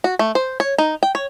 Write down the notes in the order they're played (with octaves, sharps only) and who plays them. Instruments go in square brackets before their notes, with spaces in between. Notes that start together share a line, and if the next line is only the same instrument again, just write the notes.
[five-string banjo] F#4
A3
C5
C#5
D#4
G5
C#5